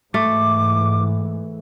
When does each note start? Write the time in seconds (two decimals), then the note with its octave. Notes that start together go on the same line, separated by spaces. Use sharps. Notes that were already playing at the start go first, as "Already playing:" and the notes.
0.14 G#2 E3 A3 D6